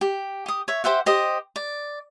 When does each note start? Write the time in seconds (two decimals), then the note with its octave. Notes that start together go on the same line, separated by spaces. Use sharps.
0.01 G4
0.46 G4 D#6
0.68 C#5 E5
0.84 G4 C5 E5 F#5
1.06 G4 C5 D#5
1.56 D5